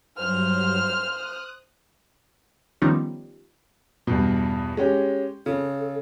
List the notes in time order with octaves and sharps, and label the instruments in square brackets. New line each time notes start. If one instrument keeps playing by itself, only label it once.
[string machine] G2 F#3 [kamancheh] C5 F6
[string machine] D#6 F#6
[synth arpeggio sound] D#3 F3 G3 B3 C#4 D#4
[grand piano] E2 G2 B2
G#3 C#4 G4
[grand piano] C#3 [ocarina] A4